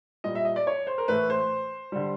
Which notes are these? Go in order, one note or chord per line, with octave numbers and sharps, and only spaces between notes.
A#2 G3 D#5
E5
D#5
D5
C#5
C5
A#4
A2 E3 A3 B4
C5
D3 G3